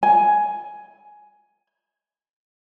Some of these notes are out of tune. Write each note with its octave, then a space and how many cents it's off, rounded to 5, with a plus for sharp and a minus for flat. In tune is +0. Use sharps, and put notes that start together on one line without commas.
G#5 +10